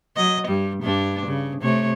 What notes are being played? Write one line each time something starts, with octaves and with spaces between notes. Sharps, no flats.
F#3 D#5
G2 G3
G2 D4
C#3
C3 A3 C#5